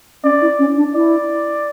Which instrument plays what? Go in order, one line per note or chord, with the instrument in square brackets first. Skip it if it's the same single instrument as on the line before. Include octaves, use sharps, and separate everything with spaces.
[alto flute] C#4 [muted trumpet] D5
[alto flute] E4
C#4
D4
[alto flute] E4 [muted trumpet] D5